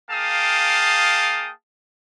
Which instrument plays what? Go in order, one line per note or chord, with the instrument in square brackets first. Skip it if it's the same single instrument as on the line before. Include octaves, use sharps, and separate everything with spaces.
[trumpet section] A#3 G#4 F5 G5 A5 D#6